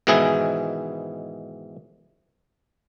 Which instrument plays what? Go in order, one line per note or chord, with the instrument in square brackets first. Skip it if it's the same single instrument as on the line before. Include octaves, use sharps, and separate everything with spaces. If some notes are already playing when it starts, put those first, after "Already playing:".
[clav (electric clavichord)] G#2 B2 D#3 E3 E4 G#4